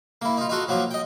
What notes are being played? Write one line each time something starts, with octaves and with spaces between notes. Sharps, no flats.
A#3 E4
D#4 F4
D#4 F4 F#4 A4
F3 F#3 A#3 F4
D#5 G5